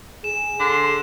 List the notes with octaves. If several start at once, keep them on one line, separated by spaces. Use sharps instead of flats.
G#4 E7
D3 C6